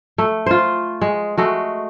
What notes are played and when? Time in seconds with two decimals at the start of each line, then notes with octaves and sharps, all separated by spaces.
0.18 A3
0.46 F4 C5
1.01 G#3
1.38 G#3 A3 F#4